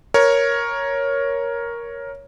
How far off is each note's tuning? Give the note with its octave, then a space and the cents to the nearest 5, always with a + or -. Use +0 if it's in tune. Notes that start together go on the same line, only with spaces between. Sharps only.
A#4 +10 C#5 +0